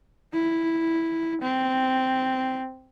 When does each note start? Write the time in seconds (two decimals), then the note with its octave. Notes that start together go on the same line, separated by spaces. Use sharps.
0.33 E4
1.41 C4